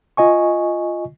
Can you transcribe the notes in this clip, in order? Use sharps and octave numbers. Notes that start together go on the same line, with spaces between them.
F4 D#5 G#5 C#6